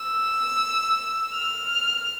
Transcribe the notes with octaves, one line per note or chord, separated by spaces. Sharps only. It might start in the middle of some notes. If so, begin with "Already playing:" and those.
Already playing: E6
F6